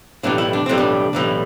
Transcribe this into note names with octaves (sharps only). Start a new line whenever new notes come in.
B1 A2 E3 G3 D4
E4
D4
B1 A2 E3 G3 C4
D4
B1 A2 E3 G3